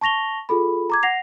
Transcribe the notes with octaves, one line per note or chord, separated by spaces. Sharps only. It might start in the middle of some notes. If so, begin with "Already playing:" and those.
A5 C#6 A#6 F7 G7
F4 G#4 A4 B5
A#5 D6 G#6
F#5 A#6 C7 F7